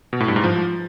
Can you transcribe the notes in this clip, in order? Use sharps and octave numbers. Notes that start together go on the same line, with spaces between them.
B2
A2
G2
G#2
F3